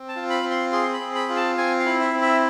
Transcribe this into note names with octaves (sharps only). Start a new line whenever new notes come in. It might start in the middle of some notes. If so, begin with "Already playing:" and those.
Already playing: C4
A5
F4
B5
C4
C6
G#4 C6
B5
C4
B5
F4
A5
C4 G#5
F5
E4
E5
C4
E5